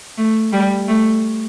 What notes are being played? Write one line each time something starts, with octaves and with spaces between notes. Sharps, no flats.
A3
G3
A3